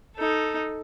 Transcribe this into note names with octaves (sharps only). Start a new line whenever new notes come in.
D#4 A4